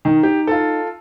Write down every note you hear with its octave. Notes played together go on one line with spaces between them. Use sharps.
D#3 D#4
G4
F4 A4